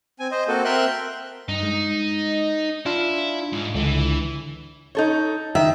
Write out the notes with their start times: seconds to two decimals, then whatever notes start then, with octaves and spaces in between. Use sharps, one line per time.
0.19 C4 G#5
0.31 C5 D#5
0.48 A#3 C4 F#4 A4
0.65 C4 A#4 E5 G5 C6 F#6
1.49 G2 D#4
1.63 G#3
2.86 D4 E4 F4 F5
3.52 G#2
3.75 C#2 D3 E3
4.95 D#4 A4 C#5
5.55 D#3 E5